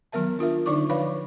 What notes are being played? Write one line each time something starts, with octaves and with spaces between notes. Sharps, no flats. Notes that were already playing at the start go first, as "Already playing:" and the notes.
D#3 F#3 B3 A#4 E5 A5
D4 F4 A#4 E5
D3 D4 D#4 D5 C#6 D6
F3 B4 C#5 F5 B5